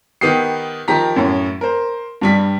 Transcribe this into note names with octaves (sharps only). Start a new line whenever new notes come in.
D#3 B3 G4 D#6 C7
D#3 F3 G4 A#5 B6
F#2 A2
A#4 C5
G2 G3 B6